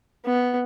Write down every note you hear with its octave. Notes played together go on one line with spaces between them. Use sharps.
B3